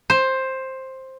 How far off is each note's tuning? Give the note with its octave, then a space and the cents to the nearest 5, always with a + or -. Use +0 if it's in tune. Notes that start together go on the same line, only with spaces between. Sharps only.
C5 +10